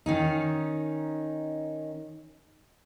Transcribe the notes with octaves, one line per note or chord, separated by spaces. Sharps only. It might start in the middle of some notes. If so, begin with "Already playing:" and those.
D#3 C#4 D#4